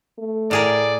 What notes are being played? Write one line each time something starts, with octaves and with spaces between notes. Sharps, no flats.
A3
A2 G#4 A#4 D5